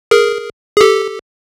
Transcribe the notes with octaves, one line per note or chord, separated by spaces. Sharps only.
G#4 A#4
G#4
G4 A4